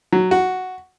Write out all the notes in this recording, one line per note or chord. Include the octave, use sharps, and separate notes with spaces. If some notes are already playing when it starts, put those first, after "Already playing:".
F#3
F#4